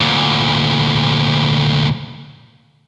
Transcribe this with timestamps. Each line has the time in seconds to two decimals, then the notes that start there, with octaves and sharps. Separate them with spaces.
0.01 D2 A#2